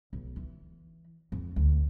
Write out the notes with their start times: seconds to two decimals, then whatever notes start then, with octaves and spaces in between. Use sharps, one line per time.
0.13 B1
0.36 E3
1.32 F2
1.56 D2